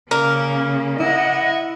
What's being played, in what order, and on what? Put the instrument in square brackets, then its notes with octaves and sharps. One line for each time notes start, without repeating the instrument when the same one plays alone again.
[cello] C#3 C#4 [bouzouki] A#3
[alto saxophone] E4 [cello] D#5 F#5